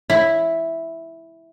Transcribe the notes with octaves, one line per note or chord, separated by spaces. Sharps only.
E4